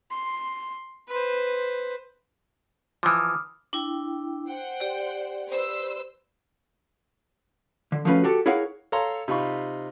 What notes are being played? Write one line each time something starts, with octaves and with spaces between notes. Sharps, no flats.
C6
B4 C5
E3 F3 D6 D#6 F6
D4 E4 G5
C5 F#5 G5
G4 D5
B4 C5 E6
D3
F3 F#3 A3 C#4 F4 B4
F#4 G4 A4
E4 G#4 A#4 C#5 F5 F#5
A4 C#5 F5 A#5 C6
C3 D#4 F4 B5 C#6